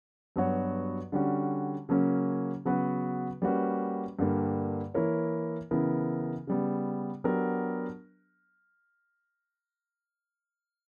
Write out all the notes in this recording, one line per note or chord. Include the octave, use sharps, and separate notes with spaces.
G2 F#3 B3 F#4 C#5
D3 G3 C#4 F#4
C#3 F#3 A#3 C#4
C#3 F#3 B3 F#4 B4
G3 A#3 C#4 F#4 B4
G2 D3 G3 A#3
E3 A#3 E4 A#4 C#5
C#3 E3 B3 E4 A#4
C#3 G3 B3
F#3 B3 D4 G4 A#4